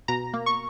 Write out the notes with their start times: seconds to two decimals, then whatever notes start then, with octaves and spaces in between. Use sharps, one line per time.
0.08 B2 A#5
0.34 A#3
0.46 C#6